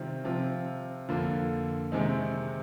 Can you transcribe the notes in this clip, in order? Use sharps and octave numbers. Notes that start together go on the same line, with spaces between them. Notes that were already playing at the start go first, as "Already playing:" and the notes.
Already playing: C3 D#3 G3 C4 F4
C3 F3 C4 F4
F2 D3 F3 A#3 F4
C3 D#3 G#3 C4 D#4